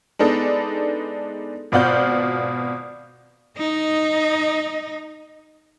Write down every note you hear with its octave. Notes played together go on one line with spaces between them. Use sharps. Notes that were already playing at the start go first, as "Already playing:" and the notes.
G#3 B3 D4 D#4 A4
G#1 B2 F4 D5 F#5 G6
D#4 D#5